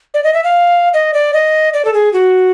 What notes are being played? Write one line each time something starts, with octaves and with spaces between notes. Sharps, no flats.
D5
D#5
E5
F5
D#5
D5
D#5
D5
A4
G#4
F#4